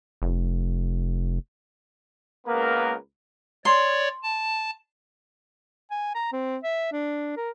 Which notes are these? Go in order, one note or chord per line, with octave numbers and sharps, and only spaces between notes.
F1
C#2 A#3 B3 A#4 B4
C#5 D5 C6
A5
G#5
A#5
C4
E5
D4
A#4